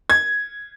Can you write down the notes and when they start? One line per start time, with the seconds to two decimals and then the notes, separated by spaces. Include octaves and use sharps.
0.10 G#6